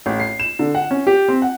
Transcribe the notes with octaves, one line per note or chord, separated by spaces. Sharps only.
A1
C7
E7
D3
F#5
C#4
G4
C4
F#5